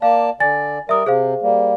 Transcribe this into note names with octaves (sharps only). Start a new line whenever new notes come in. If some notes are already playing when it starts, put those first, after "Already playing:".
A#3 D5 F5 A5
D3 D5 G#5 A6
G3 A#4 D5 E5 D#6
C3 G#4 C5 F5
G3 A#3